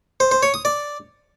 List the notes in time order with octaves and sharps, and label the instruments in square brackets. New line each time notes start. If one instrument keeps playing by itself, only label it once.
[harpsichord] C5
C5
C#5
D#6
D5